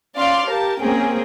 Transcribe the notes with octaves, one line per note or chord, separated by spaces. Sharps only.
C#4 D5 F5 C6
G4 A#4 A5
A#3 C4 C#4 G#4 G5